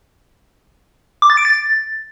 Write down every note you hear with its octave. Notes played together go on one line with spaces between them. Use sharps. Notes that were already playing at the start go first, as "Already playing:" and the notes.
D6
A6
D7
A6